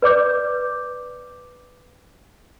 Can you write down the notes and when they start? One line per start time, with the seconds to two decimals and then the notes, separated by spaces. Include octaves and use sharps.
0.02 B4 D5 D6 G6